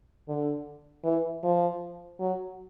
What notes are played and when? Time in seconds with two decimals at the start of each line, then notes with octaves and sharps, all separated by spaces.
0.28 D3
1.04 E3
1.43 F3
2.20 F#3